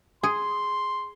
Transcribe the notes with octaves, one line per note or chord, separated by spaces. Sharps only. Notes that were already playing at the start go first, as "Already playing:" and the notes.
G#4 C6